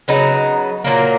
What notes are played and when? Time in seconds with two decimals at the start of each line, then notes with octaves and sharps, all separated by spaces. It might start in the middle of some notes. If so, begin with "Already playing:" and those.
0.08 C#3 F#3 B3 D#4
0.84 A#2 F#3 A#3